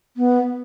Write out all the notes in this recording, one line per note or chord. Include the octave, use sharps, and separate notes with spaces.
B3